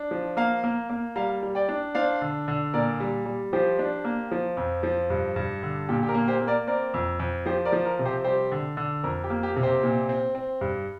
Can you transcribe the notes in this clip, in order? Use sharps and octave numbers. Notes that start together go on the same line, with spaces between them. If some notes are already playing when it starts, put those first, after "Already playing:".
Already playing: D4
F3
A#3 F5 A#5
A#3
A#3
G3 F5 A#5
G3
D5 G5
D4
D4 C5 F5
D3
D3
A#2 A#4 D5
G3
G3
F3 G4 C5
D4
A#3
F3
F2
F3
G2
G2
D3
A#2 G4
G4
A#4
A#3
G4 C5
A#3
A#4 D5
C4 A#4 D5
F2
F2
F3 G4 C5
A#4 D5
F3
A#4
C3
G4 C5
G3 G4 C5
D3
D3
F2 A#4
G4
A#3
G4
C3
G4 C5
A#2
C4
C4
G2